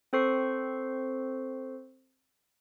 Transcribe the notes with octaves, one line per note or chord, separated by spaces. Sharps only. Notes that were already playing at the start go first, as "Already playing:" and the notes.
C4 A4 C5 C#6 C7